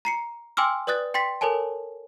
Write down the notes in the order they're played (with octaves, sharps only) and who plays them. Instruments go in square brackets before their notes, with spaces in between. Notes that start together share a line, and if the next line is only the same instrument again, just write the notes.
[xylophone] A#5 C7 C#7
G5 G#5 C6 D6 E6 F6
B4 D5 D#6 F#6 A6
G5 C6 A6 B6
A4 A#4 C#5 G#5 A5